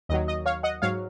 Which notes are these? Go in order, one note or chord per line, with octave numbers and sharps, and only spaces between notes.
D#2 D#3 F#3 D#5
D#5
C#5 F5
D#5 F#5
G#2 F#3 C#5 F5